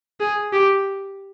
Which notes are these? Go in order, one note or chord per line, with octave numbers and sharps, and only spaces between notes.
G#4
G4